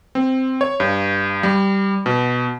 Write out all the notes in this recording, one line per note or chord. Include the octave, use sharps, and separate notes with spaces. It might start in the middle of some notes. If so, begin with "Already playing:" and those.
C4
C#5
G2
G3
B2